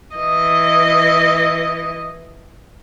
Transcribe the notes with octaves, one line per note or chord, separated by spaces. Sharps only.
E3 D#5